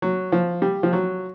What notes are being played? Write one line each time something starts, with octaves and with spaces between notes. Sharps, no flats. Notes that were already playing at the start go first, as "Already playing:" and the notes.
F#3
F3
G3
F3
F#3